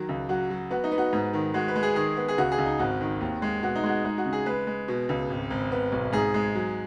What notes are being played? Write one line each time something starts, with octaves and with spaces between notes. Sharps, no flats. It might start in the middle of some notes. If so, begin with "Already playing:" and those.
Already playing: D#3 F#3
C#2
F#3 F#4
F#3
B3 F#4
D#4
B3
F#4
G#2
D#3
G#3 F#4
B4
G#3
G#4
D#3 G#4
B3
G#4
C#2 F#4
G#4
C#2
D#4
G#1 F#4
D#3
D#2
G#3
B2 F#4
D#4
G#3 F#4
G#3 D#4
F#4
C#3
G#4
G#3 B4
G#3
B2
C#2
G#1
G#1
B3
B1
G#2 G#4
G#3
F#3